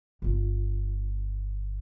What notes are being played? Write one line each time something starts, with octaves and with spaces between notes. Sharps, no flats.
G1 F4